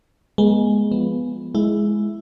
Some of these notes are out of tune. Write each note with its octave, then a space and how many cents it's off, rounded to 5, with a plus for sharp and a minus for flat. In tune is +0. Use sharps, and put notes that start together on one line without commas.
G#3 +0 B3 -40
F3 +0 B3 +0
G#3 +10 E4 +5